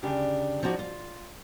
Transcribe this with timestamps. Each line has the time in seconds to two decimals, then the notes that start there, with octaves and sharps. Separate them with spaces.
0.03 D2 C#3 D4 G4
0.63 F3 D#4 E4 F#4 D5
0.79 F4